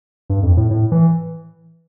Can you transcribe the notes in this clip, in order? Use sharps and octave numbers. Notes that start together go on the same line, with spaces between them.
G2
F2
A2
A2
E3